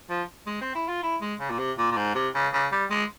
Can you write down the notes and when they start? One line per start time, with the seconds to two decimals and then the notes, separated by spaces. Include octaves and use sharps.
0.10 F3
0.46 G#3
0.61 C4
0.75 E4
0.88 F4
1.03 E4
1.21 G#3
1.40 C#3
1.50 A#2
1.59 C3
1.78 A#2
1.92 A#2
1.97 G#2
2.15 C3
2.35 C#3
2.54 C#3
2.72 G3
2.90 G#3